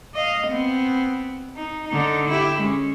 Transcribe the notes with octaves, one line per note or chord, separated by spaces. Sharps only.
D#5 F5
B3 C4
D#4
D3 D#4
E4 G4
G#3 C#4